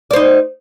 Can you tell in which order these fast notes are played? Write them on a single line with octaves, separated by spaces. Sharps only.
D5 C5 D#4